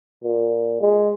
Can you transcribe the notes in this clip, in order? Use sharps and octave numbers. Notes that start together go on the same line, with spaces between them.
A#2
G#3